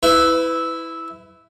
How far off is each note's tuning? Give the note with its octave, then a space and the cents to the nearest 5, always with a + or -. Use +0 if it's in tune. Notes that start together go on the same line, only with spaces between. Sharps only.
E4 -10 B4 +25